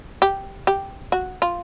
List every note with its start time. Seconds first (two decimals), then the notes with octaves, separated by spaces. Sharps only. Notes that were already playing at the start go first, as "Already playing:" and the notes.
0.22 G4
0.67 G4
1.12 F#4
1.42 F4